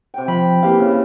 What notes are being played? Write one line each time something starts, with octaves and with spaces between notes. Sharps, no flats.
C3 G5
F3 C4 B5
E3 A#3 G4 F5
C#3